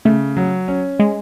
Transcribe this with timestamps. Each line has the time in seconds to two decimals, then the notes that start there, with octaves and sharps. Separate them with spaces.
0.05 C#3 A3
0.37 F#3
0.68 C#4
1.00 G#3